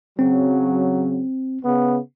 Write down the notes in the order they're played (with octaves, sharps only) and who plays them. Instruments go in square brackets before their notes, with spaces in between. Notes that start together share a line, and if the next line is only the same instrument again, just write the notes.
[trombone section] C#3 F#3 [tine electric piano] C4
[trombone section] C#3 B3